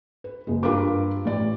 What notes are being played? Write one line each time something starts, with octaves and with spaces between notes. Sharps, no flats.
B4
F#1 G#3
G2 F4 A#4 B4 D6
A1 D5